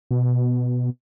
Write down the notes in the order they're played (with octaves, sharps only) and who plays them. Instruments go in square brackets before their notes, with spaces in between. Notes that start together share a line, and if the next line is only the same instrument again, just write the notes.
[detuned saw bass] B2